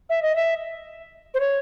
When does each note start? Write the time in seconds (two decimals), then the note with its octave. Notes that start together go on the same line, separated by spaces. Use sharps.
0.10 E5
0.22 D#5
0.36 E5
1.34 C5
1.40 C#5